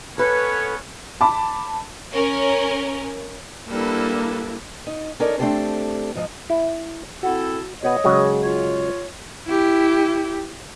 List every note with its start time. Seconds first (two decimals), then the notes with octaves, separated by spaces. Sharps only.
0.18 B3 C#4 A4 B4 C#5
1.21 A5 B5 D6
2.13 C#4 A#4
3.68 G3 A#3 D4 E4 A4 B4
4.87 D#4
5.20 C#4 D#4 A4 A#4 D5
5.39 A3 C4 D4 G4 A4 C5
6.15 G#2 F3 D#5
6.50 E4
7.23 C4 E4 F#4 A4
7.83 B2 B3 B4 C#5 D#5
8.04 C#3 F#3 G#3
8.42 F4 C#5
9.46 E4 G4